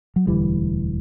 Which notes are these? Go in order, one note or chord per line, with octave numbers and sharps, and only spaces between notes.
F#3
E1 D2 D3 E3 G3